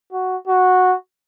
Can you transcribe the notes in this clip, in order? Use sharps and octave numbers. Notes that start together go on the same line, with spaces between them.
F#4
F#4